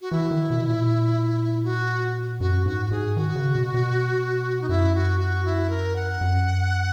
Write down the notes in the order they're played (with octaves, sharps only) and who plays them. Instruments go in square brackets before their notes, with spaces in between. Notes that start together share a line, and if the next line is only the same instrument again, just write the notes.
[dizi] F#4
[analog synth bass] E3 [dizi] E4
[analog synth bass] D#3
B2
A#2
[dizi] F#4
[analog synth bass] F#2 [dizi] F#4
[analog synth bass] G#2 [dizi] F#4
[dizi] F#4
[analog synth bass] G#2 [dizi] G#4
[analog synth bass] D#3 [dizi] F#4
[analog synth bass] C#3
B2
B2
[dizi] D#4
[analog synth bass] F#2 [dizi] E4
[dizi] F#4
F#4
E4
A#4
F#5
[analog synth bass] F#2